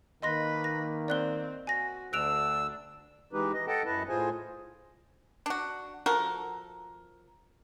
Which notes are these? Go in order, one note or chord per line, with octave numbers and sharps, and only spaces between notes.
D#3 A#3 B4 D#5 C6 A#6
A#6
C4 D5 F#6 G7
F#4 G#5 A#6
D2 D4 E6 F#6 D7 F7
E3 G#3 D#4 G4 B4
D#5
A4 D#5 F#5 G5 A5
F#2 E4 B4 D#5 A5
A2 F4 G#4 C5 G#5
D4 F#4
F3 F#4 A4 A#4